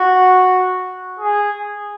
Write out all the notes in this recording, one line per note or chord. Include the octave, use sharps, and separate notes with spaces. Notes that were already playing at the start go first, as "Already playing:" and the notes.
Already playing: F#4
G#4